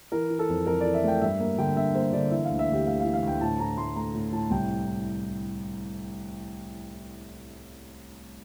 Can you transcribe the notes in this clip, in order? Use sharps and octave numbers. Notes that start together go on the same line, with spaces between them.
E3 A#4
E3
A4
F2
F2 A#4
E3 D5
E5
A3 G5
G2 E5
A#3
D3 G5
G2 E5
A#3 C5
D3 D5
E3 E5
D2 F5
E5
D2 G4
D2 F5
E3 F5
F5
D2 G5
A2 A5
A2 A#5
A2 C6
A3 A#5
A2
A2 A5
C2 G5